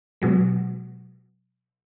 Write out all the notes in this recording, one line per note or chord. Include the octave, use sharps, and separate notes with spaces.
B2 F#3 G#3